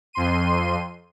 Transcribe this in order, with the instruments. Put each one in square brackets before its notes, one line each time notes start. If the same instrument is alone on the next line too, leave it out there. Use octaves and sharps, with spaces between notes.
[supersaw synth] F2 C6 D#7